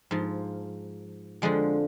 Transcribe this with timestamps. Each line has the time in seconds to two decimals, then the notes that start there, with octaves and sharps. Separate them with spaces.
0.11 G#2 F3
1.42 F2 D3 F3 G#3